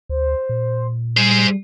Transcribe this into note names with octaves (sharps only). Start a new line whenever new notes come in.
D2 C5
A#2
G3 G#4 C5